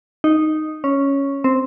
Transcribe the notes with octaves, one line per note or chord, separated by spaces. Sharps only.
D#4
C#4
C4